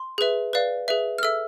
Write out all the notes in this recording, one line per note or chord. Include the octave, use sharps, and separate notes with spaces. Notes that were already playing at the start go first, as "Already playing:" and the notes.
Already playing: C6
G#4 B4 E5
B4 D5 F5
G#4 B4 E5
F6
A4 E5 E6